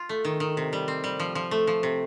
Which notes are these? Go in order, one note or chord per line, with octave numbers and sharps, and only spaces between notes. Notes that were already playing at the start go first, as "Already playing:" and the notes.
Already playing: F4
A3
D#3
D#3
C3
G3
C4
G3
F3
F3
A3
F3
C3